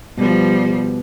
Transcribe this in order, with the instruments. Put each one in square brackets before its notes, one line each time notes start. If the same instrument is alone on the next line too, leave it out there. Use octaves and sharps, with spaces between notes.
[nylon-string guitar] B2 B3 [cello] F3 G3